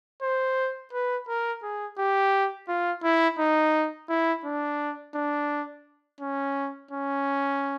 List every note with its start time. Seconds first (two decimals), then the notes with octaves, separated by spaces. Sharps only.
0.22 C5
0.93 B4
1.28 A#4
1.63 G#4
1.98 G4
2.68 F4
3.03 E4
3.39 D#4
4.09 E4
4.45 D4
5.14 D4
6.21 C#4
6.91 C#4